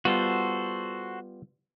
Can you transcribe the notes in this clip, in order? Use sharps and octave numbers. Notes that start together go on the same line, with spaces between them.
G3 B3 F4 F#4 A4 C5